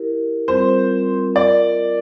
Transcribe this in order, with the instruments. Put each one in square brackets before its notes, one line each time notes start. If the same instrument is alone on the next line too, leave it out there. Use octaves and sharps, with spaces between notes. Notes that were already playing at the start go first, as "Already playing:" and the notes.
Already playing: [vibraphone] E4 G4 A#4
[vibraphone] G3 C4 F4 A#4 [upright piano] C5
[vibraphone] F4 A#4 D#5 [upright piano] D5